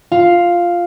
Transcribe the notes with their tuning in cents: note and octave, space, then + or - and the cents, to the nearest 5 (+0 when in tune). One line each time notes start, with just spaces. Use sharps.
F4 +0 F5 +0